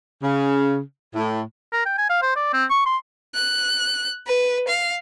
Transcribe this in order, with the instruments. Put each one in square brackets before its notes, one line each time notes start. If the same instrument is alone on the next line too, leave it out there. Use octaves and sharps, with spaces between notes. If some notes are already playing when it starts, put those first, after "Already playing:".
[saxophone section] C#3
A2
[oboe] A#4
G5
G#5
F5
C5
D5
C4
C#6
C6
[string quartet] F#6
B4
F5